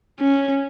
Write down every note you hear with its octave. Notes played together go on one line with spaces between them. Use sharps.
C#4